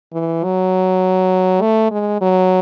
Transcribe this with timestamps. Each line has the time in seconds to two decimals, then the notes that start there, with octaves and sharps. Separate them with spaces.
0.13 E3
0.43 F#3
1.61 A3
1.91 G#3
2.21 F#3